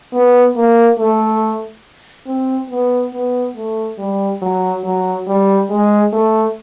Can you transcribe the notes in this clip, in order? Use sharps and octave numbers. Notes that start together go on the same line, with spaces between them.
B3
A#3
A3
C4
B3
B3
A3
G3
F#3
F#3
G3
G#3
A3